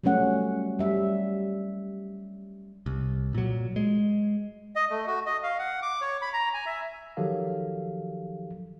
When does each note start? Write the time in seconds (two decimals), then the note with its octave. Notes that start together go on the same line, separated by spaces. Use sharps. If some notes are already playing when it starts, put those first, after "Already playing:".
0.04 F#3 G3 A3 C#4 F#5
0.79 G3 E5
2.86 C2
3.34 A#2 F#3
3.76 G#3
4.76 D#5
4.90 A3
5.07 F#4
5.26 D#5
5.43 F5
5.59 F#5
5.82 D6
6.01 C#5
6.22 B5
6.33 A#5
6.54 G#5
6.66 E5
7.17 D#3 F3 F#3 G4 A4 F5